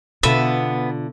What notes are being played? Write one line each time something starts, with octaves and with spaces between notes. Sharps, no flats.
B2 D3 B3 F4 E5